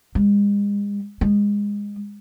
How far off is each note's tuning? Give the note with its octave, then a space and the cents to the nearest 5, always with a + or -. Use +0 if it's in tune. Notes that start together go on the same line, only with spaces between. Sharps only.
G#3 -40
G#3 -20